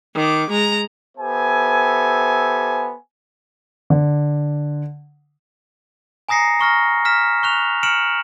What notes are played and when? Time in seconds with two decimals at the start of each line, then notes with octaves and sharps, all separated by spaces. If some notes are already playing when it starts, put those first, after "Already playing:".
0.15 D#3 D6
0.50 G#3 A#5
1.18 B3 G4 A4 C5 E5 G#5
3.90 D3
6.29 G#5 A#5 D#6 A#6 C7 C#7
6.59 A#5 C#6 F6 A#6
7.05 F6 B6 E7
7.43 C#6 F#6 F7
7.83 F6 C#7 D7 E7 F#7